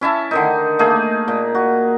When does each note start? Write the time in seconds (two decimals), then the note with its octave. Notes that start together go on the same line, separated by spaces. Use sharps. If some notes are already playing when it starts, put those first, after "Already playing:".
0.01 C#4 E4 E5 A5
0.31 D3 D#3 D#4
0.79 A3 A#3 D#4 G#4
1.28 A#2
1.55 F#4